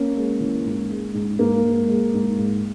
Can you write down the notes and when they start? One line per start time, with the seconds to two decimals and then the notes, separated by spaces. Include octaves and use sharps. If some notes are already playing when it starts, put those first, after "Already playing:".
Already playing: A#3 C#4
0.17 G#3
0.40 E3
0.65 G#2
0.90 G#3
1.14 G#2
1.39 G#2 A#3
1.64 G#2
1.88 G#3
2.14 G#2
2.38 G#2